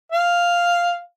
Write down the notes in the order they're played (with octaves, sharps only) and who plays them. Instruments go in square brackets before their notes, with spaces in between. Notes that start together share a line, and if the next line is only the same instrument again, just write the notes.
[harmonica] F5